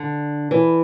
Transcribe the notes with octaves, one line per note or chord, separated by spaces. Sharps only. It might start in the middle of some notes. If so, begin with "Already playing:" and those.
Already playing: D3
E3